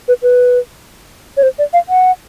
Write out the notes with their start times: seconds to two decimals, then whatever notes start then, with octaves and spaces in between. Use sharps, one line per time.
0.08 B4
0.22 B4
1.37 C#5
1.43 C5
1.59 D5
1.73 F5
1.89 F#5